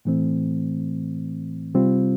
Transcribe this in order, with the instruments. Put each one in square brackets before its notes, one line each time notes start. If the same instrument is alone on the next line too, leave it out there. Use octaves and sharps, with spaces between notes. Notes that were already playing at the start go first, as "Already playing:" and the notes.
[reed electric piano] A2 E3 A3 C4
C3 G3 C4 F4